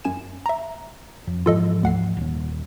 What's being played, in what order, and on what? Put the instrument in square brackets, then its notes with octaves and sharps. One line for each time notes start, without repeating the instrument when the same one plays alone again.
[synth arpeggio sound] F#2 G#5 E7
E5 A#5
[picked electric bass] F2
[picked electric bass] G#2 E3 F3 [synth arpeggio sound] F4 A4 D#5
[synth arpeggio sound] D2 F#5 C7
[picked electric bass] D#1 D#2